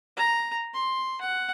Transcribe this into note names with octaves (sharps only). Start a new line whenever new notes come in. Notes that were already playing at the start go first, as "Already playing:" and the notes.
A#5
C6
F#5